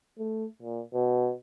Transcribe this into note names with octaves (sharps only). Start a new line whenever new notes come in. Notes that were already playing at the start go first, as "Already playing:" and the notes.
A3
A#2
B2